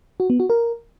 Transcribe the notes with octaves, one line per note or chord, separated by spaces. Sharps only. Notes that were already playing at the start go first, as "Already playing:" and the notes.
F#4
B3
F#4
A#4